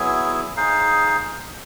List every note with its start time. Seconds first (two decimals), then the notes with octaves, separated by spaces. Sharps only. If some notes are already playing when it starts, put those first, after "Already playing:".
Already playing: F#3 B3 E4 G#4
0.56 D#4 G#4 C5 F5